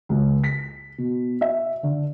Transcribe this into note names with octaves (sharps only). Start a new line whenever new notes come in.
C#2
B6
B2
E5
D3